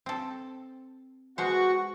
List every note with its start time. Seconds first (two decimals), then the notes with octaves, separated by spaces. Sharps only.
0.06 C4 A4
1.38 B2 G#3 F#4 C5 C#6